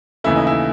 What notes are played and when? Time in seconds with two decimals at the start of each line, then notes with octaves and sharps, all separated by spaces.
0.24 D#2 C#3 E3 A3 E4
0.36 D#4
0.47 E4